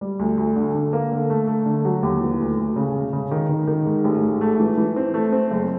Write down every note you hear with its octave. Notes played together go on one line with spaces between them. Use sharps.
G3
D2
D2
D3
D3
A#3
D3
A3
A3
D3
F#3
D#2
E3
D2
D2
C#3
E1
C#3
D#3
D#3
D#3
G#2
A1
G#2
A3
E3
E3
C4
A3
C4
F#1